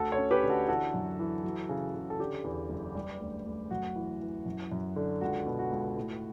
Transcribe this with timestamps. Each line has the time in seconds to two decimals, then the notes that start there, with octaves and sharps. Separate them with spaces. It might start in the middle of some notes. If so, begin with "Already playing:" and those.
Already playing: D2 F#4 A4
0.12 A4 C#5
0.18 C#4
0.31 G4 B4
0.43 D3
0.49 F#4 A4
0.68 E3 F#4 A4
0.94 F#2
1.19 E3
1.44 F#3
1.69 C#3
1.95 C#3
2.10 A4
2.19 D3 G4
2.44 E2
2.70 F#1
2.95 G3
3.20 D2
3.46 D2
3.71 F#2 F#4
3.96 E3
4.20 E3
4.46 F#2
4.72 F#2
4.96 D3
5.21 C#2 F#4
5.46 B2
5.59 F#4
5.72 C#2
5.97 A2